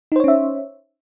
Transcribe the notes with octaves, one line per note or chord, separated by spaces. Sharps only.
C#4 D#4 C5 C#5 E5